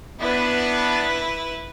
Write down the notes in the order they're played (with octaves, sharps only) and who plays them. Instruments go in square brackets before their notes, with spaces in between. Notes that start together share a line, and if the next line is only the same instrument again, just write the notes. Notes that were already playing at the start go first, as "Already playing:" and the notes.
[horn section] B3 D4 [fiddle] E4 B4